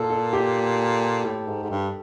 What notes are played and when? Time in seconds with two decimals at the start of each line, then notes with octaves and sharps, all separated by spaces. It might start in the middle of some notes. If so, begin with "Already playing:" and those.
Already playing: A#2 A4 A#4
0.10 A4
0.33 G4
1.25 A2
1.48 G#2
1.63 G#2
1.70 G2